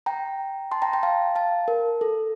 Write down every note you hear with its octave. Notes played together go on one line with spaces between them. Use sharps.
G5 A#5
A5 C6
G5 A#5
G5 A#5
F5 A5
F5 A5
A#4
A4